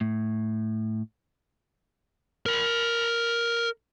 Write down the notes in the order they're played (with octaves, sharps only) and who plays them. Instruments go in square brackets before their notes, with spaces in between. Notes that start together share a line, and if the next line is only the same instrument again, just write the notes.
[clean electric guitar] A2
[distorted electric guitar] A#4 B5